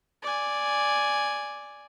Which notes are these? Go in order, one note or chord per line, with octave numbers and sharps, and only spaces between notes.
D5 G#5